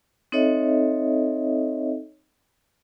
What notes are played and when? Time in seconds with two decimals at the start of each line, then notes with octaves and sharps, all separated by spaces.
0.32 C4 D#4 A4 C#5 D#5 E5